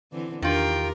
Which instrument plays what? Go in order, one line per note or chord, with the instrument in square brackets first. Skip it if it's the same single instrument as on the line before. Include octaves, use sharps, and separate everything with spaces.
[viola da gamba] D3 E3 C4
[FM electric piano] E2 D4 [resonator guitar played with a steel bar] D#3 F4 [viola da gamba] G4 A#4 [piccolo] G5